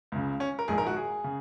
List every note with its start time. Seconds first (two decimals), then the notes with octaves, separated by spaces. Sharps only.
0.12 C#2 C#3
0.40 C#4
0.59 A#4
0.68 A#1 G#2 D#3 G#4
0.78 A#4
0.87 F#4
0.96 G#4
1.24 C#3